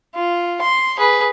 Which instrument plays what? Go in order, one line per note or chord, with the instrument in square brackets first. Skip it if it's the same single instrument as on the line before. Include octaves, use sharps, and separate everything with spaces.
[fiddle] F4
C6
G#4 B4